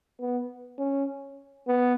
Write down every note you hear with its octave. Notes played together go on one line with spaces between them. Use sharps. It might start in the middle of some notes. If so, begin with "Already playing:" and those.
B3
C#4
B3